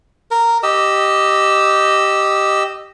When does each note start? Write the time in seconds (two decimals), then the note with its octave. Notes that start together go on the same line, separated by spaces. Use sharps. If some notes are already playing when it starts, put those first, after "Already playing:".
0.31 A#4
0.63 G4 D#5 E6